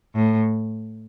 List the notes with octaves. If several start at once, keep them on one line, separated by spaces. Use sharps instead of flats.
A2